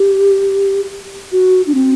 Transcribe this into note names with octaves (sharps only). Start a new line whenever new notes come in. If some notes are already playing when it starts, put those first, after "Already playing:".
Already playing: G4
F#4
D4
C4